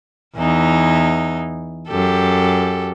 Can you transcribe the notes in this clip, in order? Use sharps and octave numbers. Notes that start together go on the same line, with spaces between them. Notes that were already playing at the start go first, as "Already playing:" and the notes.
E2 E3 D#4
F#2 G4 A4